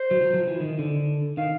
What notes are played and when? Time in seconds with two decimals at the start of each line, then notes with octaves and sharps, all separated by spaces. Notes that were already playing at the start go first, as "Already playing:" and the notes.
Already playing: C5
0.11 F#3
0.21 F#3
0.34 F3
0.47 E3
0.60 D#3
0.79 D3
1.37 D#3 F5